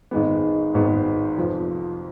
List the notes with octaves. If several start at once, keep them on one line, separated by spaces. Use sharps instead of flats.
G#1 G#2 D#3 G#3 B3
G#1 G#2 D#3 G#3 B3
F2 C3 F3